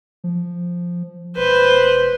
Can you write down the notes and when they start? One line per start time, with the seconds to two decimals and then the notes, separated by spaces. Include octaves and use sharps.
0.24 F3
1.37 E1 B4 C5